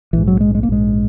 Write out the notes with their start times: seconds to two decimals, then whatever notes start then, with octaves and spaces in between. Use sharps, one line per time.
0.13 A#1 E3
0.18 G#2
0.28 F#3
0.40 G#3
0.55 G#3
0.63 A#3
0.69 A#1 G#2 G#3